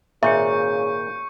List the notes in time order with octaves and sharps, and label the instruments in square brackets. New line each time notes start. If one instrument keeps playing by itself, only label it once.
[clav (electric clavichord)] G#1 A#2 [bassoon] C#3 [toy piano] E5 [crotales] C#6 G6 C#7